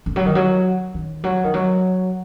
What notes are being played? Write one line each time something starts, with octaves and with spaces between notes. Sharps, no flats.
D3
F#3
D#3
F#3
D#3
F#3
D#3
F#3